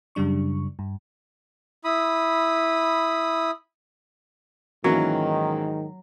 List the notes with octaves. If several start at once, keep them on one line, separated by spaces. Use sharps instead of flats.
F#2 C#3 G3 D4 C#6
G2
E4 B5 D#6
G#2 D#3 E3 F#3 A#3 C#4